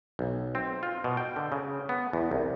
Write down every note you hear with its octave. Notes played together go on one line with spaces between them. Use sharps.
B1
C4
F4
B2
G5
D3
C#3
B3
E2
C2